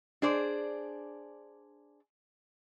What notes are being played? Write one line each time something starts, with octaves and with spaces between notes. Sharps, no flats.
D4 G#4 C5 D5